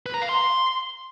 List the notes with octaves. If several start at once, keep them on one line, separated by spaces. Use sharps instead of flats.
B4
A#5
F5
C6